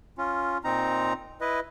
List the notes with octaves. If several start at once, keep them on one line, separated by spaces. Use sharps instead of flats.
C#4 F4
A#2 C4 D#4 A#5
E4 B4 D#5